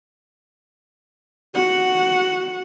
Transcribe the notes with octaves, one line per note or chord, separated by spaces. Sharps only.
F#4 F#5